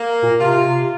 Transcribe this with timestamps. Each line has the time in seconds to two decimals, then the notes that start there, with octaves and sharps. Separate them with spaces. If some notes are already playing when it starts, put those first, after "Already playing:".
Already playing: A#3
0.23 A#2
0.39 C3 F4